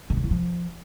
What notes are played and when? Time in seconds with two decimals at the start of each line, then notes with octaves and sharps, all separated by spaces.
0.10 D3
0.17 C#3
0.24 E3
0.31 F3